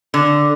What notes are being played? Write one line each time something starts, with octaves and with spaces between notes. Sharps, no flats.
D3